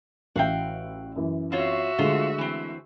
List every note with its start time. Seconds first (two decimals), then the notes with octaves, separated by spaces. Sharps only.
0.36 A1 F#4 E5 F5 G5
1.16 F#2 E3
1.52 C4 F4 F#4 C#5 E5
1.99 D3 G#3 A3 F4 C5
2.38 E3 C4